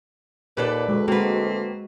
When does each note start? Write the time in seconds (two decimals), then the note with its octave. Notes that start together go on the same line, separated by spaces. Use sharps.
0.57 D#2 A#2 A4 B4 D5
0.88 D2 G#3
1.08 G#3 A#3 C4 F#4 B4